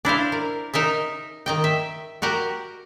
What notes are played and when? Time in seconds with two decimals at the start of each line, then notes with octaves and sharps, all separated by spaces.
0.05 D4 E4 C5 F5
0.32 A#4
0.74 D#4 A#4 D#5 E5
1.46 D#3 D#5 G5
1.64 E5
2.22 F#4 G4 A#4 F#5